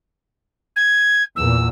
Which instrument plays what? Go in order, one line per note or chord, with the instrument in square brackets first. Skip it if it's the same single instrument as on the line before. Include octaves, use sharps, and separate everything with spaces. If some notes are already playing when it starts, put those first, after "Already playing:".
[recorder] G#6
[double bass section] E2 A#2 [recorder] E6